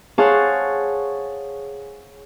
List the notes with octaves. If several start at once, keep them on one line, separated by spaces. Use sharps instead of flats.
G#4 C5 C#5 F5 F#5 A5